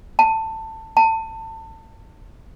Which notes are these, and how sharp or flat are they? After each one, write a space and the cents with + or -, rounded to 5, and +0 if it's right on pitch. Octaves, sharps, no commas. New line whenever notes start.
A5 +15
A5 +25